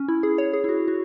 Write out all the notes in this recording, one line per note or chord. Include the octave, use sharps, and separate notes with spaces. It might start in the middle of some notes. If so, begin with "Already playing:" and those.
Already playing: C#4
E4
G#4
C#5
G#4
E4
F#4
F#4